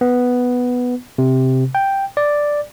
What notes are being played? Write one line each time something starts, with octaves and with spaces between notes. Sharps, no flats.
B3
C3
G5
D5